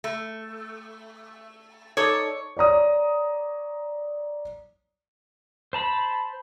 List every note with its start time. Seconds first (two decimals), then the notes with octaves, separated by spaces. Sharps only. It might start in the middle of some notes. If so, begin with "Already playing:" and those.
0.04 A3
1.97 D#4 A4 C#5 D5
2.57 C#5 D5 A#5 D#6
5.73 C5 A5 B5